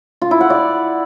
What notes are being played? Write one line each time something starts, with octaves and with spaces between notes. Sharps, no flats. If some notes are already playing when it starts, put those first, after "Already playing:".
F4
E4
F#5
D5